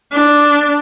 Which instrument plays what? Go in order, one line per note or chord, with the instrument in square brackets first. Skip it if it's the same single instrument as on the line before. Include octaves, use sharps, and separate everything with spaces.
[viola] D4